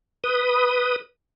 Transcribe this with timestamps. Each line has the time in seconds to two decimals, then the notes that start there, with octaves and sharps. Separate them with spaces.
0.24 B4 D#6